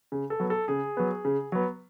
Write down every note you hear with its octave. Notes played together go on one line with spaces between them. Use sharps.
C#3
A4
F#3 B3
A4
C#3 G#4
F#3 B3
C#3
F#3 B3